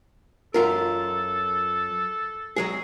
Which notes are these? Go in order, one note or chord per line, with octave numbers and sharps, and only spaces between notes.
F#2 F4 A4 A#4
F#3 G#3 G#4